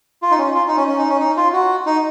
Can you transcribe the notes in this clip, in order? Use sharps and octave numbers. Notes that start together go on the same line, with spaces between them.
F4
D#4
C#4
F4
D#4
C#4
C#4
D#4
C#4
D#4
F4
F#4
D#4